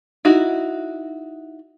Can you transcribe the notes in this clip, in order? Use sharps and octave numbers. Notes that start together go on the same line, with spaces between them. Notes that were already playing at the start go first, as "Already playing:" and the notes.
D#4 E4 F#4